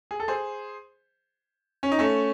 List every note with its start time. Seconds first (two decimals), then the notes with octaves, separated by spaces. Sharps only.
0.11 G#4
0.20 A4
0.28 G#4 C5
1.83 C#4
1.92 D#4
1.99 A3 C#4